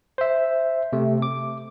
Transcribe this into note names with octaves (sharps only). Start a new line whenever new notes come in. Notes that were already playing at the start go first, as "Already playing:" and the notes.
C5 E5
C3 A3
D6